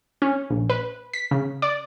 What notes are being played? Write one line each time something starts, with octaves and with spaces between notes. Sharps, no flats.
C#4
A#1
B4
B6
C#3
D5